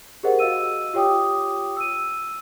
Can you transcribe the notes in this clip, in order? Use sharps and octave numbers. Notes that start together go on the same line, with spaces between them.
G4 G#4 A#4 C5 D#5 F#5
F#4 D#5 F5 E6 D#7
F4 G4 C#5 G5 D6 D#6
E6 D#7